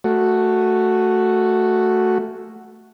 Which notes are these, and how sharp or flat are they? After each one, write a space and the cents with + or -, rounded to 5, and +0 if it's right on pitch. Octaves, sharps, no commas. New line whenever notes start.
A3 +0 F#4 +0